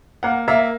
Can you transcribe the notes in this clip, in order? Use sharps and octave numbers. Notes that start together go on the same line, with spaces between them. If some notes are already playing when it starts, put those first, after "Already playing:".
A#3 F#5
A#3 E5